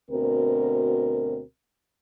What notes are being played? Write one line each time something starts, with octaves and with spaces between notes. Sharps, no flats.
D2 B2 C4 A#4